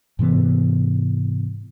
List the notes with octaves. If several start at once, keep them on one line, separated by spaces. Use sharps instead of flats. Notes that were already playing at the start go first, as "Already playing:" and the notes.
G#2 C3 E3 B3